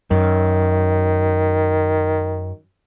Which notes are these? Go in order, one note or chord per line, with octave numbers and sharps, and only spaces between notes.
F#2 D#3